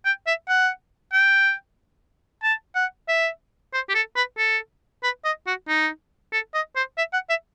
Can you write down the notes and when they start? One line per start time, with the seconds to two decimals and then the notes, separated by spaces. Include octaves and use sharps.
0.05 G5
0.27 E5
0.49 F#5
1.13 G5
2.43 A5
2.75 F#5
3.08 E5
3.73 C5
3.89 G4
3.95 A4
4.16 B4
4.38 A4
5.03 B4
5.25 D#5
5.47 F#4
5.68 D#4
6.32 A4
6.54 D#5
6.76 C5
6.98 E5
7.13 F#5
7.30 E5